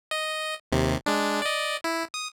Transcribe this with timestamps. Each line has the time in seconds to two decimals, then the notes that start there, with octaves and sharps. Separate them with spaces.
0.11 D#5
0.72 D#2 C3
1.06 G#3 D4
1.42 D5 D#5
1.84 E4
2.14 D#6